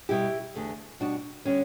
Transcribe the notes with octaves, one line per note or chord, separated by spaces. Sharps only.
B2 G3 B3 E4 G4
E2 D3 A3
B2 G3 B3 D4 F#4
D3 G3 B3 C#4